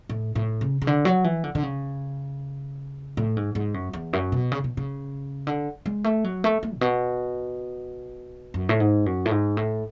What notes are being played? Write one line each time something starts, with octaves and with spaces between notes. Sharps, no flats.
A2
A2
C#3
C#3
D3
F#3
E3
D3
D3
C#3
A2
G#2
G#2
F#2
E2
F#2
B2
C#3
B2
C#3
D3
G#3
A3
F#3
A3
A3
A2
B2
F#2
A2
G#2
F#2
A2
G#2
A2